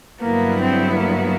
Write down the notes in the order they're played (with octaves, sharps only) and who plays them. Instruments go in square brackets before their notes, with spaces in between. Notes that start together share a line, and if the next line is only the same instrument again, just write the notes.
[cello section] G2 D3 F#3 B3 E4 [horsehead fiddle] A#3
[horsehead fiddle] C4
A#3